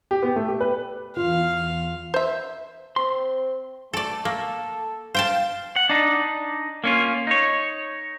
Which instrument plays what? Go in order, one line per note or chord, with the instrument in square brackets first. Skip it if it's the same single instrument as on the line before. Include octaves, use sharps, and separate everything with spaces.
[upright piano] G4
B3
A3
G4
B4
[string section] E2 [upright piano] F4 [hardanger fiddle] F5 [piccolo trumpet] F6
[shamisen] C5 E5
[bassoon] C4 [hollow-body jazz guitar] C6
[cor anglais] A3 [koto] A4 D5
[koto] A#3 [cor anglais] A4
[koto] C5 G5 A5 [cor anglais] F5
[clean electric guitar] F#5
D4 D#4
A#3 C#4 F4
D#4 C#5